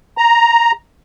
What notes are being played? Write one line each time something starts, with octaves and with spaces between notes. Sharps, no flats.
A#5